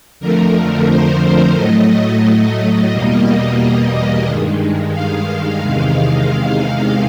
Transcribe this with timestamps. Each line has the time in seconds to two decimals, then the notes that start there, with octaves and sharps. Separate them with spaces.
0.20 F2 D3 F3 A3 A#4
0.88 C5
1.55 A2 F#3 A3 D#5
2.23 D#5
2.90 E2 B2 G3 A#3
4.25 G2 D#3 G#3
4.93 F5
5.60 E2 C3 D#3 G#3
6.28 F5